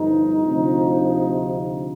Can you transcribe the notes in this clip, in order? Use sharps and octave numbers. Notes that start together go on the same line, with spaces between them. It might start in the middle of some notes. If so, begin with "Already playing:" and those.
Already playing: G1 G2 D3 F3 D#4
D2 C3 F3